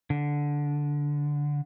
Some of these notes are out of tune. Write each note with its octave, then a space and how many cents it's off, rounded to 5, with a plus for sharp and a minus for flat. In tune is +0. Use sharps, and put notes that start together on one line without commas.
D3 -10